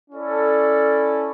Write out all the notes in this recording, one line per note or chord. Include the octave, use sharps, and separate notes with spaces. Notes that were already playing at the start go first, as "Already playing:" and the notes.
C#4 E4 A4 D5